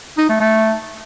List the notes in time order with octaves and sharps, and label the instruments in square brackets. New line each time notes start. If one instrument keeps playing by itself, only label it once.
[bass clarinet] D#4
A3
A3